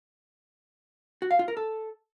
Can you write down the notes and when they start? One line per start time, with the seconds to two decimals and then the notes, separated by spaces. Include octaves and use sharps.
1.22 F#4
1.31 F5
1.39 F4
1.48 A#4
1.57 A4